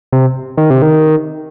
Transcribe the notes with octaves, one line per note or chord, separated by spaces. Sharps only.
C3
D#3
C3
D#3